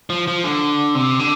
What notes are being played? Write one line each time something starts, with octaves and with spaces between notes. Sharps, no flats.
F3
F3
D3
C3
D3